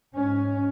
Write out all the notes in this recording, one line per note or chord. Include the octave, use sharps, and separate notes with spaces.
G#2 C#4